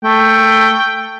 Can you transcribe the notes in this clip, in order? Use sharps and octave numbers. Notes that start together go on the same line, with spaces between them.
A3 G5